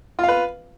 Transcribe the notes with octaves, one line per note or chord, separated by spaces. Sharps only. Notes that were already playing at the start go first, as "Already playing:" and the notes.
F4 B4 F5